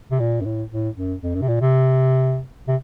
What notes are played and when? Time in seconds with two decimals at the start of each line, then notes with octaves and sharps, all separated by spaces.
0.11 C3
0.20 A#2
0.41 F#2
0.45 A2
0.71 A2
0.96 F#2
1.23 F2
1.35 F#2
1.42 C3
1.48 A#2
1.61 C3
2.68 C3